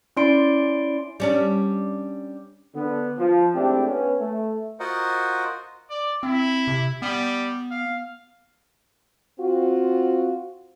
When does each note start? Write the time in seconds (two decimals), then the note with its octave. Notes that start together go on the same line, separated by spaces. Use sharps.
0.17 C#4 E4 D5 C6 D7
1.20 G3 C#4 D4
2.74 D3 B3
3.19 F3
3.55 G#2 A3 C4 D4 E4 G4
3.88 B3 C#4
4.20 A3
4.80 F4 F#4 A#4 C5 D#5 F#5
5.90 D5
6.23 C4 E4
6.67 C3
7.02 G3 B3
7.71 F5
9.39 C4 F4 F#4